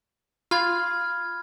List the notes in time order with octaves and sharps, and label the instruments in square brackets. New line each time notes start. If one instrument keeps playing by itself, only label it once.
[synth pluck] F4 [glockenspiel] B5 F6 G#6